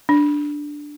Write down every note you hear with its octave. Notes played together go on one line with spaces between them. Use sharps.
D4